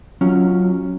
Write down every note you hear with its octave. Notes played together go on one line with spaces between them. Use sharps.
F#3 C#4 F4